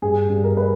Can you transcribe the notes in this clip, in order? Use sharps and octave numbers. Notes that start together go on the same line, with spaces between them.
G2 G#4
G2
A#4
B4